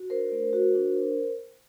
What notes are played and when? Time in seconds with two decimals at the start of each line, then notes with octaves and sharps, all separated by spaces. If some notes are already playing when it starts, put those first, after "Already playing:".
Already playing: F#4
0.10 D4 A#4 C5
0.32 A3
0.53 F#4
0.75 D4